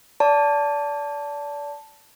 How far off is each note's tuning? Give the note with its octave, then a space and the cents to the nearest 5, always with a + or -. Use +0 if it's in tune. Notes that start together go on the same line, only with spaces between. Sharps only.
D5 -30 A5 +0